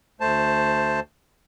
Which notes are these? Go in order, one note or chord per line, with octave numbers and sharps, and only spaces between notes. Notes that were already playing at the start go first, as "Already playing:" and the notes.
D2 A3 C5 A5